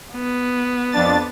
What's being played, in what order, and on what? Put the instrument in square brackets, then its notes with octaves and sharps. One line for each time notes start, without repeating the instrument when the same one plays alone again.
[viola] B3
[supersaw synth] F2 D4 A6